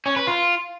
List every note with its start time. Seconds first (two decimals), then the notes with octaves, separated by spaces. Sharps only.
0.06 C#4
0.16 B4
0.27 F4